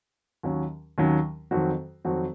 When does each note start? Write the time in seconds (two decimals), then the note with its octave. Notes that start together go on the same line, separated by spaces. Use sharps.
0.43 D#2 D#3 F#3 C#4
0.98 D#2 D#3 F#3 C#4
1.51 F2 D#3 F#3 C4 F#4
2.05 F2 D#3 F#3 C4 F#4